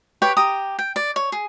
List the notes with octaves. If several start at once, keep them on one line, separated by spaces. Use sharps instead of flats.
G4 B4 C#5 G5
G4 G5 A#5 D#6
G5
D5
C#5
G#4